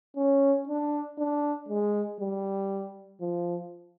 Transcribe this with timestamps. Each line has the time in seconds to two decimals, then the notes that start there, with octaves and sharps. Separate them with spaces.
0.17 C#4
0.68 D4
1.18 D4
1.68 G#3
2.20 G3
3.21 F3